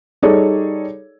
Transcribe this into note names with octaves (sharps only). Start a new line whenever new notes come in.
G3 D#4 G#4 A4 C#5 D5